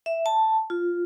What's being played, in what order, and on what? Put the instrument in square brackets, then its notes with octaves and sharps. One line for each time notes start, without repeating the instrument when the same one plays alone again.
[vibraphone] E5
A5
F4